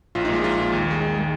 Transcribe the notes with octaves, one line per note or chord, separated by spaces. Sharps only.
A#1 F4
D#4
A#2 G#3 F4
A#1 F4
A#2 G#3
D#2
D#3 G#3
D#2 D#4
D#3 G#3